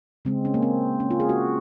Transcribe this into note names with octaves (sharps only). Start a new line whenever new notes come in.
C#3 G#3 C4
C#4
A#3
C4
C#4
F4
G#4
F#4